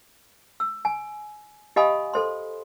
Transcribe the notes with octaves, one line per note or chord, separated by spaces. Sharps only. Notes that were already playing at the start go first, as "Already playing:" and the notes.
E6
G#5
G4 D#5 F5 G#5 B5 D#6
A4 C5 C6